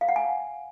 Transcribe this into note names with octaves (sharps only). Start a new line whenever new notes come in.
F5
F#5
G#5